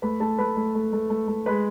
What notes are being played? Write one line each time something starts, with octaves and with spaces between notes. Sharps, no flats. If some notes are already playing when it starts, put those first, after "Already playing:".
A3 B4 B5
A3 A4 A5
A3 B4 B5
A3
A3
A3
A3
A3
G#3 B4 B5